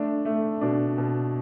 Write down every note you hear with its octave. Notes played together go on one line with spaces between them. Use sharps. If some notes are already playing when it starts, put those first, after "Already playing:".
Already playing: A3 D4
A3
B2 D4
B2